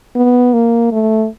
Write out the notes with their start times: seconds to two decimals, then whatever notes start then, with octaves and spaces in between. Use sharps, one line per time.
0.15 B3
0.53 A#3
0.92 A3